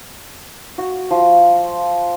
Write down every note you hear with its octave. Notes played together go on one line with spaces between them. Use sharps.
F#4
F3